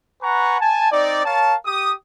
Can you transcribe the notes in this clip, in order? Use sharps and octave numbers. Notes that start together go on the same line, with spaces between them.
B4 F#5 G#5 A#5 C#6
G#5 A5
C4 D#4 D5
A#4 C#5 F5 A5
G4 D#6